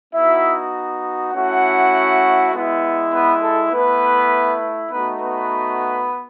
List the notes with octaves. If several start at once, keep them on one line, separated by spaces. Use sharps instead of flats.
B3 D#4 E4 F#4 E5
A3 C#4 E4 F#4 F#5
G#3 B3 E4
B3 B4
A4
A3 B3 E4 B4
A3 B3 D#4 F#4 B4
B3 B4